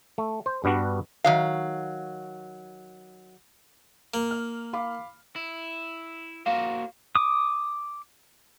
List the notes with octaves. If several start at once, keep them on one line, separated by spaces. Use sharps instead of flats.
A3
C5
G2 G3 B3 D4 F#4
D#3 F#3 F5
A#3
F6
F5 B5 D6
E4
A#3 F#4 C5 F5
D6 D#6